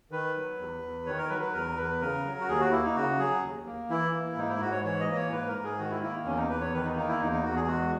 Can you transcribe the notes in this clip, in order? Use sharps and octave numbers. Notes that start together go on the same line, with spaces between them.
D#3 B4
F#3
E2
E2
D#3 C#5
A#4
F#3 B4
B4
E2 A#4
E2 B4
C#3 A#4
F#3
F#4
D#2 G#4
F#4
A#3 E4
D#4
C#3 F#4
F#3 G#4
D#2
A#3
E3 E4
A#3
G#2 D#4
E4
G#2 F#4
C#5
E3 C#5
D#5
A#3
C#5
G#2 B4
A#4
G#2
G#4
D#3 F#4
E4
A#3 E4
E2 C#4
D#4
E2 B4
C#5
D#3 B4
D#4
A#3 D#4
E4
E2 D#4
D#4
E2 F#4
G#4
G#3 F#4